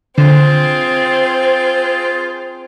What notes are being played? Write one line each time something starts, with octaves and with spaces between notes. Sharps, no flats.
D3 C4 F4 G#4 C5